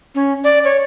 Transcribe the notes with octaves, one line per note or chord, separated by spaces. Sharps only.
C#4
D5
C#5